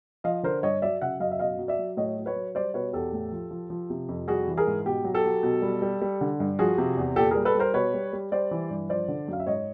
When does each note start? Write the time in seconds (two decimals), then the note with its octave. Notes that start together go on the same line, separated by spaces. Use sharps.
0.24 F3 D#5 F5
0.43 D3 A#4 C5
0.63 G2 C#5 D#5
0.82 F#3 D5 E5
1.01 C#3 E5 F#5
1.20 F#2 D#5 F5
1.31 E5
1.39 B2 D#5 F5
1.59 F#3
1.68 D5 E5
1.79 F#3
1.97 A2 C#5 D#5
2.17 F#3
2.26 B4 C#5
2.36 F#3
2.55 G3 C5 D5
2.74 B2 B4 C#5
2.93 E2 G4 A4
3.13 A2
3.32 F3
3.51 F3
3.70 F3
3.90 C3
4.09 F2
4.28 G3 F#4 G#4
4.48 E3
4.57 G#4 A#4
4.67 G#2
4.85 B2 G4
5.04 F#3
5.14 G4 A4
5.25 F#3
5.43 B2
5.62 G3
5.82 G3
6.02 G3
6.21 D3
6.40 G2
6.59 F3 F#4 G#4
6.78 C3
6.97 E2
7.16 A#2 G4 A4
7.31 G3 G#4 A#4
7.45 A4 B4
7.54 G3
7.59 A#4 C5
7.74 B2 B4 C#5
7.94 G3
8.13 G3
8.32 G3 C5 D5
8.51 E3
8.70 G2
8.89 F3 C5 D5
9.08 D3
9.28 F#2 F5
9.40 E5
9.47 G#2 C#5 D#5